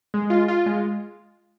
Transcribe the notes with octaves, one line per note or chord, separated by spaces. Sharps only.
G#3
F4
F4
G#3